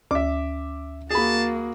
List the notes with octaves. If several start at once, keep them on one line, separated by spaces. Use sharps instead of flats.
D2 E5 D6
A#3 F#4 G#4 A5 B5